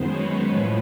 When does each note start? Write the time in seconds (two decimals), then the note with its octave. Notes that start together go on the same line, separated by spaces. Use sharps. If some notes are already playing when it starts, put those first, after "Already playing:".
Already playing: F#2 D#3 G#3 B3 C5
0.09 B4 C#5
0.50 A2 F3 B4